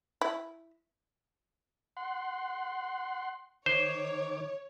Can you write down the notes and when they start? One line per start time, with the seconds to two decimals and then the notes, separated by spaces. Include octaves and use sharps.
0.21 E4
1.97 F#5 C6
3.66 D#3 C5 C#5 D6